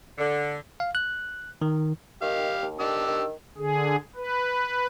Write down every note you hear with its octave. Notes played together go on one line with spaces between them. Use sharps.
D3
F5
F#6
D#3
D#3 G4 F5
D#2
D#3 D4 G4 E6
D#3
D3 G#4
B4